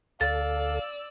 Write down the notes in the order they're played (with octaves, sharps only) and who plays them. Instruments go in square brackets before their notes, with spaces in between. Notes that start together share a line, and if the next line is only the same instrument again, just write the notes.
[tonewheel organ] D2 A4 [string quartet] D5 E6 [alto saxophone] F5 [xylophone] A6